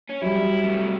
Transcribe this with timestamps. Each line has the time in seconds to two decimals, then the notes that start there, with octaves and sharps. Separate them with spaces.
0.09 C#4
0.22 F#3 G3 E4
0.63 C3 A3